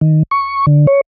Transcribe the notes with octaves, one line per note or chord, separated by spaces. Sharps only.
D#3
C#6
D3
C#5